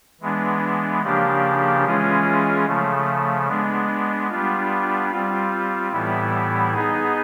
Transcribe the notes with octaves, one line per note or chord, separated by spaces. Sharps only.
E3 G#3 B3 D4
C#3 F3 A#3 D4 G4
E3 G#3 C#4 F4 G#4
C#3 F3 A3
G#3 B3 D4
G3 B3 D4 F4
G3 C4 F4
A2 E3 G3 B3 E4
B3 D#4 G#4